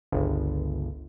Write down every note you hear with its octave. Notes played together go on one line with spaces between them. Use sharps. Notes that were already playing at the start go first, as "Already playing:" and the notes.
G1 C#2